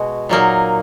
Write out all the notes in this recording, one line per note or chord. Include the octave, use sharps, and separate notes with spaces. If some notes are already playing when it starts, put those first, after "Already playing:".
Already playing: B2 G#3 F#4
A#2 F#3 A#3 D#4